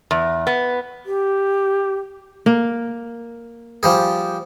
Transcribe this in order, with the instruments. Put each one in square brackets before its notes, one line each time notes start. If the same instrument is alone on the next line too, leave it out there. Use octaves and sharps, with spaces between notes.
[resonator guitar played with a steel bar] E2
B3
[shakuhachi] G4
[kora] A#3
[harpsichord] F3 G3 G#4